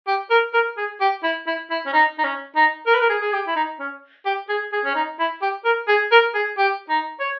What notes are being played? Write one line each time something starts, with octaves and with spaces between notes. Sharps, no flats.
G4
A#4
A#4
G#4
G4
E4
E4
E4
C#4
D#4
D#4
C#4
D#4
A#4
B4
A#4
G#4
G#4
G4
E4
D#4
C#4
G4
G#4
G#4
C#4
D#4
E4
G4
A#4
G#4
A#4
G#4
G4
D#4
C#5